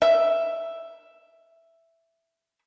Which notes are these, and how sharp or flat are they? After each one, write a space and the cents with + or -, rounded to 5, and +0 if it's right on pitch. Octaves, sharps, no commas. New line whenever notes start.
E5 +5